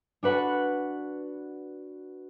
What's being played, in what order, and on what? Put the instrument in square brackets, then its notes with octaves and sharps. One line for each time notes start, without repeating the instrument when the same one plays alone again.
[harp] D4 F#4 B4 F#5